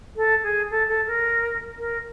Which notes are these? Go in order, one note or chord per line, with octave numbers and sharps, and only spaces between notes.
A4
G#4
A4
A4
A#4
A#4